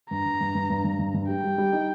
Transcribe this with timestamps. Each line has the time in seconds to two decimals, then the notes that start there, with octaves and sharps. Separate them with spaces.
0.10 G2 A#5
0.25 G2
0.40 G2
0.55 G2
0.70 G2
0.84 G2
0.99 G2
1.14 G2
1.28 G3 G5
1.43 G3
1.58 G3
1.72 D#4